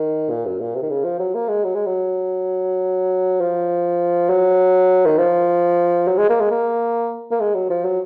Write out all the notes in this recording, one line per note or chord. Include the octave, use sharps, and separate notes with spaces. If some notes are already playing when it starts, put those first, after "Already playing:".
Already playing: D#3
A#2
F#2
A#2
C3
D#3
C#3
F3
F#3
A#3
G#3
F#3
G#3
F#3
F3
F#3
D#3
F3
F#3
G#3
A#3
G#3
A#3
A#3
G#3
F#3
F3
F#3